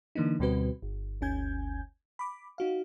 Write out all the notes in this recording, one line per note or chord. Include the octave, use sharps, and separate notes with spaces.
D3 E3 A#3 D4 D#4
D2 B2 G3 C4 F#4 B4
G1
G1 D2 C#4 G#5 G6 G#6
B5 D6
D#4 F#4 F5